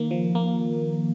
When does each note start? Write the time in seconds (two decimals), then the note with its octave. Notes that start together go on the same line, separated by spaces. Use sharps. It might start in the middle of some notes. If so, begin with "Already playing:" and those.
Already playing: D#3 A#3
0.11 F3
0.35 A#3